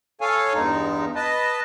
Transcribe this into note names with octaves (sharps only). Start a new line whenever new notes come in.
A4 C#5 F5 G#5
E2 G2 G#3 D#4
B4 D#5 A5